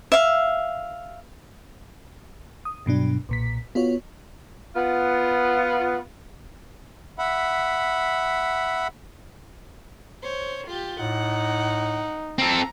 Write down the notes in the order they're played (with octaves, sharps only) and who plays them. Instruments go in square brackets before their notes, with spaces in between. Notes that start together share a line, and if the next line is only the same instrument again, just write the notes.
[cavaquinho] E5 F5
[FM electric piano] D#6
G2 B2 F#3 D4
B1 A#2 B6
B3 F4 F#4 C#5
[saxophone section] B3 F4
[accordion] E5 F#5 B5
[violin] C5 C#5
F4 G4
[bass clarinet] A2 [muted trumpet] D#4 [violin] F#5
[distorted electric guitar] C4 A4 [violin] A#5